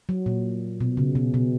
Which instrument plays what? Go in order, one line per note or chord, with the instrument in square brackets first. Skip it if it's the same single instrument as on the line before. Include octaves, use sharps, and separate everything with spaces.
[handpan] F#3
A#2
B2
C#3
B2
B2